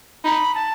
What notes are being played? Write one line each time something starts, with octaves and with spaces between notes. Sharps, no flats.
D#4 B5
A5